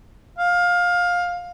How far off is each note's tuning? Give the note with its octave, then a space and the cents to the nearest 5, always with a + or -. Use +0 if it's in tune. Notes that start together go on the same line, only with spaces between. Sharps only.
F5 +20